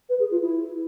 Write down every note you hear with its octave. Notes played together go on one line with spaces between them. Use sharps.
B4
G#4
F4
E4